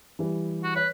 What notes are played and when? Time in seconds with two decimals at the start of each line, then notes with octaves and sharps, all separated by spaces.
0.19 E3 G3
0.64 F#4
0.76 B4 C#5